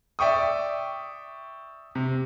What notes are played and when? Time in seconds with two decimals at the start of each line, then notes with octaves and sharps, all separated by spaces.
0.19 D5 E5 G5 C#6 D#6
1.95 C3